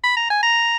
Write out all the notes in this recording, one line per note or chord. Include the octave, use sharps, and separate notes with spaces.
B5
A#5
G#5
A#5